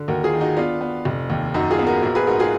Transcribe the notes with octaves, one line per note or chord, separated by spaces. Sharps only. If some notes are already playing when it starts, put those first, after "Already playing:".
Already playing: D3
D#2 F#4 A#4
F4 G#4
D#3
D#4 F#4
B3 D4 F4
B3
F1
D#2
F#2 D#4 F#4
F4 G#4
B3
F#4 A#4
A#1 F#4 A#4
G#4 B4
G#2 F#4 A#4
F4 G#4